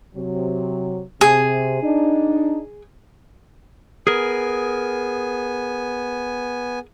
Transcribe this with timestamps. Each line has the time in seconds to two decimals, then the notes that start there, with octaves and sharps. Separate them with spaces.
0.16 C3 F#3
1.21 C3 G#4
1.83 D4 D#4
4.07 B3 G#4 A#4 G#5